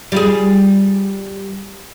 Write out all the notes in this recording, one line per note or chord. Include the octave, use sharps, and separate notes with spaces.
G3 F4 G#4